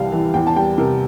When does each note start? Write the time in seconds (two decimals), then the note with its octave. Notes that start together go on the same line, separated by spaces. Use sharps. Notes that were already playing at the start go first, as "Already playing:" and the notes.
Already playing: C2 C3 E3 G3 F5 G5 A5
0.12 E3
0.34 E2 G5
0.47 A5
0.56 G3 G5
0.78 C3 A#4